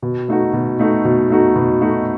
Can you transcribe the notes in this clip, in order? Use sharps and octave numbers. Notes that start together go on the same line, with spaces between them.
B2
A3 D#4 F#4
B2
A3 D#4 F#4
B2
A3 D#4 F#4
B2
A3 D#4 F#4